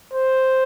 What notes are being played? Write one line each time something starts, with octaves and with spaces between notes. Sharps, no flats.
C5